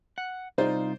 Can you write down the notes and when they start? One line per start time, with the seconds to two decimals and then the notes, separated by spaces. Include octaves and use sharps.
0.18 F#5
0.58 C2 D#4 F4 C5 D5